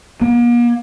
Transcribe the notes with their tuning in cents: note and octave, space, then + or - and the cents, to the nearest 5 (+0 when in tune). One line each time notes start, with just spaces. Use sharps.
A#3 +45